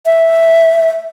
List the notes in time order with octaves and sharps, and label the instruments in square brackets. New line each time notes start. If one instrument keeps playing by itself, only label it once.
[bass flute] E5